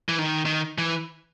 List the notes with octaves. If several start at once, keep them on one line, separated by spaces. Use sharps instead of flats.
E3
D#3
D#3
E3